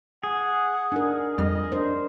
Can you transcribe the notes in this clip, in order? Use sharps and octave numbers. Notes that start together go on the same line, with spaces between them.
G#4 F#5
D4 D#4 A#4
F2 G3 D#5 F6
D4 A#4 C5